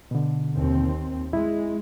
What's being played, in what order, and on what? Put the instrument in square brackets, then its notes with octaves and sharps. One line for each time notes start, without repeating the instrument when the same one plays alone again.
[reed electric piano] B2 D3
[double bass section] D#2 C4
[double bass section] G#3 [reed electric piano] E4